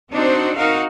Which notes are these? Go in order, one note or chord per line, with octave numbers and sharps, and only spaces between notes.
C4 D4 D#4 F#4 C5
D#4 F#4 A#4 F5